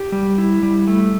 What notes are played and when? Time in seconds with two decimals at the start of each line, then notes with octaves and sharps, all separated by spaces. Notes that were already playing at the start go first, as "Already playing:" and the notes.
Already playing: G4
0.12 G3
0.38 E4
0.63 G3
0.88 A3